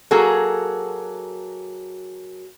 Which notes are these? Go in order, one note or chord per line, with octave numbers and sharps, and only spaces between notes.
F#3 A#3 F#4 G#4 A4